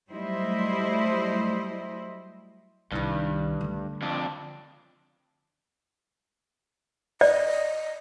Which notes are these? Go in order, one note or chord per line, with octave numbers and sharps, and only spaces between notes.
F#3 G3 A3 E4 C5 D#5
C2 G2 D#3
D3 A3
F2 D4
D5 D#5